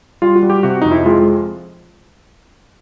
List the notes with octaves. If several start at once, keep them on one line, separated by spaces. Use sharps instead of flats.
G3 F4
F#4
G3
G4
C3 F#4
F2 D#4
E4
G#3 F4